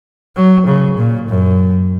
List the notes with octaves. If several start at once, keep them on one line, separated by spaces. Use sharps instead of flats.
F#3
C#3
A#2
F#2